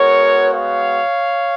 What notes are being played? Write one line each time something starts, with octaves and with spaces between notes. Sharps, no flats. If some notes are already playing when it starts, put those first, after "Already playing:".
Already playing: G#3 B3 F#4 A#4 C#5
C#5 F5